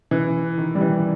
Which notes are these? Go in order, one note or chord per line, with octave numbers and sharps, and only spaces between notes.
E3
D#3
G3
E3